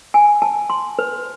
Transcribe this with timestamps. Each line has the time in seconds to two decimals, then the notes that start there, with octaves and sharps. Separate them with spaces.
0.14 G#5
0.42 A5
0.70 C6
0.99 B4